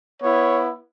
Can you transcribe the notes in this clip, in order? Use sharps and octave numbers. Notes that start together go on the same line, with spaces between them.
B3 E4 C#5